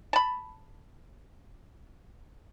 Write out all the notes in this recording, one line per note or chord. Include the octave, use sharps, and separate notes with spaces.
A5 B5